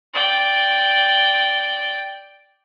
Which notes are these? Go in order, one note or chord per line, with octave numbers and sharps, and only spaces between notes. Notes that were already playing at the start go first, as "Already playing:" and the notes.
D5 G5